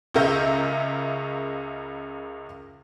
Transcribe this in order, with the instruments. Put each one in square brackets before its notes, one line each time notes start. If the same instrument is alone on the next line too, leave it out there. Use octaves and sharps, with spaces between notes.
[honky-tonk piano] C#2 C#3 C#4 A#4 E5 G6